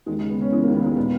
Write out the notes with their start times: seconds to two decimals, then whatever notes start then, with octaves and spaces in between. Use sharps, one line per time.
0.06 D#2 G#3
0.19 G#3
0.21 C#3
0.29 B3
0.37 C#3 C#4
0.51 E3 G#3
0.63 A#3
0.67 D#2
0.74 B3
0.82 D#2 G#3
0.96 A#2 B3